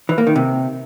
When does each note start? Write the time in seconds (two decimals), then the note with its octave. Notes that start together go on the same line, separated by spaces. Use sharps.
0.09 E3
0.18 A#3
0.27 D#3
0.36 C3